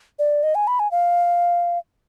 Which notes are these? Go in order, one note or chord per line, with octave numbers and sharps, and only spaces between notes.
D5
D#5
G#5
B5
G#5
F5